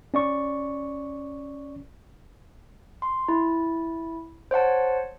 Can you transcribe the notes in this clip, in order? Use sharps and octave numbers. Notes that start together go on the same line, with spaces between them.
C#4 D5 C#6
C6
E4
C5 C#5 F#5 A5